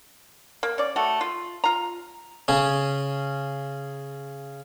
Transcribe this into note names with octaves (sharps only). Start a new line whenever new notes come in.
A#3
C#4 D5
A3 F#4
F4
F4 A#5
C#3 C#4